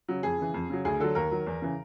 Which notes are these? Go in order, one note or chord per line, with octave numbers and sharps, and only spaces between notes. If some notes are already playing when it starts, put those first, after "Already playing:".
C#3 F#3
F2 G#4
C#3 E3
F2
C#3 F#3
D2 G#4
D3 F#3 A4
D#2 A#4
D#3 F#3
E2
C#3 E3